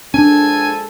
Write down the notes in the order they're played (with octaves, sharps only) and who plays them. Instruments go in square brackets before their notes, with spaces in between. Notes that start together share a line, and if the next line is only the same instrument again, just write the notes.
[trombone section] A#1 G#3 A4 [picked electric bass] C#4 D4 [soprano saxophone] G#5